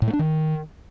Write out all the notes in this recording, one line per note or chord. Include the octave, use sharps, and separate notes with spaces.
A2
A3
D4
D#3